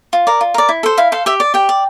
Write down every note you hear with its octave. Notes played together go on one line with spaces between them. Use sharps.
F4
A#4 D5
F4
A#4 D5
E4
A4 C5
E4 F5
A4 C5 F5
G4 E5
D5
G4 G5
D5